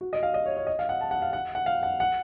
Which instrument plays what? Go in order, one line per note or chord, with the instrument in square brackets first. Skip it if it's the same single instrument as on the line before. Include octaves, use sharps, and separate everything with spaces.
[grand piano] F#4
D#5
F5
D#5
C#5
C#5
D#5
F5
F#5
A5
F#5
F5
F#5
F#5
F5
F#5
F#5